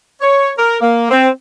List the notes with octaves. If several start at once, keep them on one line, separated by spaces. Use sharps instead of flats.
C#5
A#4
A#3
C4